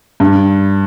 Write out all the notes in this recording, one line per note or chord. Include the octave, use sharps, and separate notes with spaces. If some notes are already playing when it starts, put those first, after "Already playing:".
G2